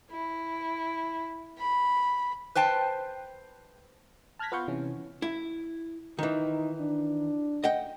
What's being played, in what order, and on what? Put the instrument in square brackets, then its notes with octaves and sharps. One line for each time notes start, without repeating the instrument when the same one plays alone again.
[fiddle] E4
B5
[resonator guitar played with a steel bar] B4 C5 G5 A5
[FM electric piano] A5 F6 F#6 G#6 A#6 B6
B3 F4 B4 F5 C#6 G6
C3 E3 C#4
[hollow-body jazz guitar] E4
[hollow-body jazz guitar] D#3 E3 [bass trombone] D#4
[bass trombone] D4
[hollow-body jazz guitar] D#5 F#5 G5